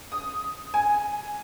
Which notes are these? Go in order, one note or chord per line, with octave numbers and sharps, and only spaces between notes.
D#6
G#5